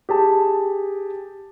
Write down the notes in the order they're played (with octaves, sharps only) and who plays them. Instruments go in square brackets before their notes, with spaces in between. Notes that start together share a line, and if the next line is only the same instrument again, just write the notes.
[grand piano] G4 G#4 A5